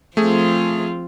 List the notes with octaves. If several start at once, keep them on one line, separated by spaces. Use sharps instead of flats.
F3 A3 C4 F4 G#4